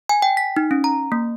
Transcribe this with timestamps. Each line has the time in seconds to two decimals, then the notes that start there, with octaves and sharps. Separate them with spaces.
0.09 G#5
0.22 G5
0.37 B6
0.57 D#4
0.71 C#4
0.84 A#5
1.12 A#3